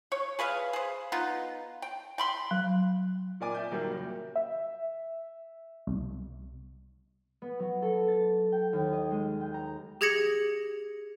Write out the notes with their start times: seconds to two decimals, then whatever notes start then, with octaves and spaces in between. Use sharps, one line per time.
0.12 C#5
0.39 G#4 B4 E5 F5
0.73 G#4 C5
1.12 B3 D#4 F4
1.82 G5
2.18 G5 B5 C6
2.51 F#3
3.40 A#2 A#4 D5 G#5 D6
3.55 D5 E5 G6
3.71 A#2 D#3 F#3 G3 A#3
3.90 F#1
4.36 E5
5.87 C2
7.42 B3
7.59 F#3
7.82 A4
8.08 A6
8.52 G5
8.73 D#2
8.92 D#5
9.11 G#3
9.41 G5
9.54 A#5
10.01 G4 G#4 G#6 A#6 C#7 F#7